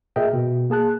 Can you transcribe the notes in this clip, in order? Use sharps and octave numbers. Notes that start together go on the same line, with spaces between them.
A#2 G#4 A#4 D#5 E5 G5
B2
A#3 G#4 A5 F#6